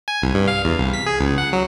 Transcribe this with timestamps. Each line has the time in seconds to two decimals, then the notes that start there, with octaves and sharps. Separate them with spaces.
0.08 G#5
0.22 C2
0.34 G2
0.48 F5
0.65 E2
0.78 C2
0.94 B6
1.06 G#4
1.21 C#2
1.38 F#5
1.53 F#3